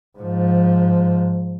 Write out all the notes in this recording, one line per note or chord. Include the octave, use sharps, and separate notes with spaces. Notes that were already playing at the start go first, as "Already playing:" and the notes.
G#2 F3